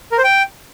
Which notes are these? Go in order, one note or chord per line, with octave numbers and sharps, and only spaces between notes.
A#4
C5
G5